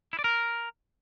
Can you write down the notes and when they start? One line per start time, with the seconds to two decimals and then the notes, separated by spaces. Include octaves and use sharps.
0.13 E4
0.19 D5
0.24 A#4